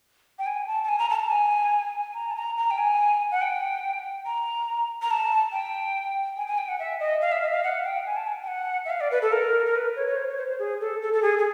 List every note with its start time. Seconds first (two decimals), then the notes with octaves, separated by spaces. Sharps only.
0.39 G5
0.46 G#5
0.67 A5
0.84 A5
0.89 G#5
0.99 A#5
1.10 A5
1.16 A#5
1.20 A5
1.30 G#5
2.14 A#5
2.30 A5
2.36 A#5
2.57 A#5
2.71 G5
2.78 G#5
3.32 F#5
3.42 G5
4.26 A#5
5.02 A#5
5.11 A5
5.52 G5
6.37 G#5
6.47 G#5
6.58 G5
6.68 F#5
6.79 E5
7.00 D#5
7.21 F5
7.32 E5
7.43 D#5
7.48 E5
7.53 F5
7.64 F#5
7.85 G5
8.06 G#5
8.16 A5
8.27 G#5
8.42 G5
8.48 F#5
8.85 E5
8.90 F5
9.01 D5
9.11 B4
9.22 A4
9.32 A#4
9.66 A#4
9.75 B4
9.96 C#5
10.07 C#5
10.16 C5
10.27 C#5
10.37 C5
10.48 C5
10.59 G#4
10.81 A4
11.02 A4
11.13 A4
11.22 G#4
11.38 G#4